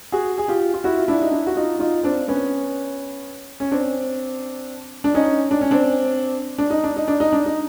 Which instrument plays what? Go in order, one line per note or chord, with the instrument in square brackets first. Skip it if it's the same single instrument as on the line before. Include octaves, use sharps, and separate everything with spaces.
[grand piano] F#4 G#4
G#4
F4 G4
F4
E4 F#4
F4
D4 E4
D#4
D4 E4
F#4
D#4 F4
D#4 F4
C4 D4
B3 C#4
C#4
C4 D4
D4
C#4 D#4
D4
C#4
C4 D4
D4
D#4
D4
D#4
D4
D#4
D4
D#4